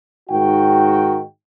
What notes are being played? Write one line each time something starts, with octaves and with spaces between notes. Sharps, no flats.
G#2 D#3 F#4 G5